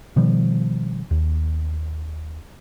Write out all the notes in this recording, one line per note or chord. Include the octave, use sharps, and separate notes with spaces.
B2 D#3 F3 G3
D#2